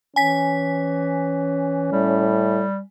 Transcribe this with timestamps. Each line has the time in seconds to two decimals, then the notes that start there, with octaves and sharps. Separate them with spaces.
0.16 E3 C#4 G#5 B6
1.92 A2 G3